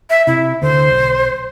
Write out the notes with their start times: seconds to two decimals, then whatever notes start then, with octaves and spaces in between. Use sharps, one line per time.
0.10 E5
0.27 C3 E4
0.62 D2 D3 C5
0.91 B1